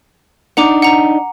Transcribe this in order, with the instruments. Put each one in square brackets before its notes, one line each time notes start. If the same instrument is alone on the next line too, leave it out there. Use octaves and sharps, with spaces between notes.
[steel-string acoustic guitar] D4 D#4 [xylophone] F#5 A#5 D6
[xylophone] F#5 A#5